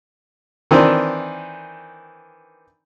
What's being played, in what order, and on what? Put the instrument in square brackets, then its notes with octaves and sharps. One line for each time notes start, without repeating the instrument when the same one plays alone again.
[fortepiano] D#3 E3 C4 D4